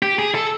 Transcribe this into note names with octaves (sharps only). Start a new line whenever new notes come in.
G4
G#4
A4